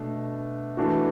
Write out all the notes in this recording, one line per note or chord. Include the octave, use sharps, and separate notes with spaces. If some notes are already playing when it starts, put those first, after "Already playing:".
Already playing: B2 A3 D4
E3 A3 D4 F#4